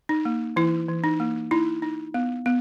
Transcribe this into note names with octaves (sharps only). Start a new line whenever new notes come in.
D#4
A#3
E3 E4
E3
D#4
A#3
D#4 E4
D#4
B3
B3